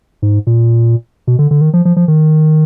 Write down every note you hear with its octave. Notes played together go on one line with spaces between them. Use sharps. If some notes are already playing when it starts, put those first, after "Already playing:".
G#2
A#2
B2
D3
D3
D#3
F3
F3
F3
D#3